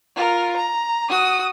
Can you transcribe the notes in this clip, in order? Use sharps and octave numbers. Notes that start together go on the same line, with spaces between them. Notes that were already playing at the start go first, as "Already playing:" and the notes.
F4 A#4
A#5
F#4 D#6